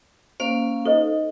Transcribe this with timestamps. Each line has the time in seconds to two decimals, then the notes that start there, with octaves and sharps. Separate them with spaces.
0.40 A#3 C#4 C5 F5
0.86 D#4 A4 C5 D#5